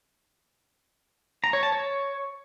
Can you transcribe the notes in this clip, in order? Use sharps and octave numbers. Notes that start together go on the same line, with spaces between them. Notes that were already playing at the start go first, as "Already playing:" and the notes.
A#5
C#5
A5
C#5